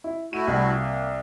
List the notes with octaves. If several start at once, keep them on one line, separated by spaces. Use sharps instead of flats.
E4
A3 E4 F#4 D#7
C2
A#3